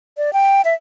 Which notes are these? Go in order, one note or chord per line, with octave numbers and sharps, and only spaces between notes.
D5
G5
E5